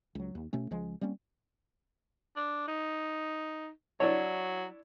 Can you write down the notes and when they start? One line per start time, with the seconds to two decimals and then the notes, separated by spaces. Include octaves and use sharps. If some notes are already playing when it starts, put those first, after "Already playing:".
0.15 C#2 F#3
0.35 D#2
0.53 B2 A3 C#4
0.71 C#2 F3 G#3
1.01 G3 A#3 C4 C#4
2.36 D4
2.68 D#4
4.00 F#3 D4 E4 C#5